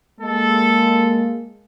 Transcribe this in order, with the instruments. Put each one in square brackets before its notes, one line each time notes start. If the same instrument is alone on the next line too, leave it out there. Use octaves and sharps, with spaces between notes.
[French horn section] G#3 A#3 [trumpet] A4